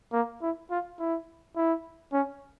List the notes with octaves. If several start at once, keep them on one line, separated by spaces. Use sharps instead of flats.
A#3
E4
F4
E4
E4
C#4